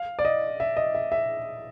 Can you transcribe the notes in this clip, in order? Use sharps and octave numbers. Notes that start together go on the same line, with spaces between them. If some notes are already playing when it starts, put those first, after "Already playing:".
Already playing: F5
D5
D#5
E5
D#5
E5
E5